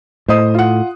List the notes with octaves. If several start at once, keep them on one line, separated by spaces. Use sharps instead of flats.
A2 C5 D#5 D#6
F4 F#5